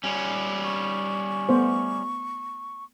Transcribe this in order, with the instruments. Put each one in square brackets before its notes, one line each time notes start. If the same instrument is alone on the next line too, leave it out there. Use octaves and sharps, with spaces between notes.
[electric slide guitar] G3 C#4
[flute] C#6
[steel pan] A3 B3 C5